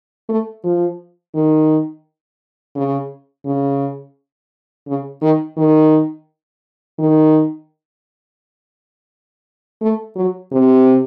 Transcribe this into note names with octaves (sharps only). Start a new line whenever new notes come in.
A3
F3
D#3
C#3
C#3
C#3
D#3
D#3
D#3
A3
F#3
C3